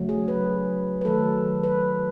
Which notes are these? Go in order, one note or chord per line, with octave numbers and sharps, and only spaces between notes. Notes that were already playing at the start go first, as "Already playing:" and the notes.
Already playing: C#3 F#3 A3
G#4
B4
B4
D#3 F#3 A3 A4
B4